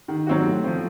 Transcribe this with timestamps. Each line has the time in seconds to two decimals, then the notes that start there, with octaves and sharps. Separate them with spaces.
0.08 D#3
0.27 F#3 C4 F#4
0.46 A2
0.64 F3 C4